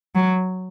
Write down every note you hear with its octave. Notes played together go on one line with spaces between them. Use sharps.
F#3